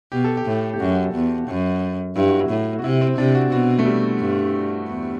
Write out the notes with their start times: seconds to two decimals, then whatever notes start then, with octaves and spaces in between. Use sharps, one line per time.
0.12 B2 G4
0.24 A4
0.37 G4
0.46 A2
0.74 G4
0.80 F#2 F#4
1.14 E2
1.48 F#2
2.16 G2 E4
2.29 F#4
2.41 E4
2.50 A2
2.79 F#4
2.83 C3 E4
3.01 C4
3.18 C3 D4
3.35 F#4
3.52 B2 F#4
3.79 A3
3.85 G3
4.19 G2
4.87 E2